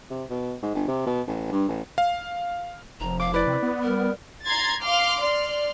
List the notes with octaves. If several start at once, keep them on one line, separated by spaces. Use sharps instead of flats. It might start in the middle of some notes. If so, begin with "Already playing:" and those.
C3
B2
G#2
G1
C3
B2
A1
G2
A1
F5
F1 F3 A#5
F5 D6
E4 B4 D5
C3
B3
G3 A#4
A#5 C6 G#6 A6
F5 C6 D6 F6
D5 C6 F6